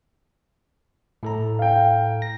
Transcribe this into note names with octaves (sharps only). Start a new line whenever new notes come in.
A2 A4 A#5
F5 G5
A#6